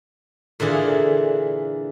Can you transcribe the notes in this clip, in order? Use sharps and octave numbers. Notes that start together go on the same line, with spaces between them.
A#2 D3 E3 G#4 F5